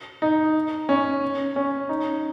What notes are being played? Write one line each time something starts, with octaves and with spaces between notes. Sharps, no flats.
D#4
C#4
C#4
D#4